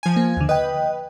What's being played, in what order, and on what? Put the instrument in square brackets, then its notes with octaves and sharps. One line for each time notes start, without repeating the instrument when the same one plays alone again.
[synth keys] F3 G#5
[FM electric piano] A#3
D#2 D3
[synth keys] B4 [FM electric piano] D#5 G5